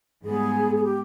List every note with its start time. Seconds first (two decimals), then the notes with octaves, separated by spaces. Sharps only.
0.24 G#2 G3 B3 G#4
0.75 G#4
0.84 G4